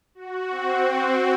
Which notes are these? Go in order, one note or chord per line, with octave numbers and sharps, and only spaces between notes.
F#4
C4